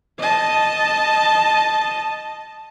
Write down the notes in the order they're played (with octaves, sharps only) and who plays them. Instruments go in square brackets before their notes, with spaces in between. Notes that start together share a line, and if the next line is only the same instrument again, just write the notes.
[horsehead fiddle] D#5 A5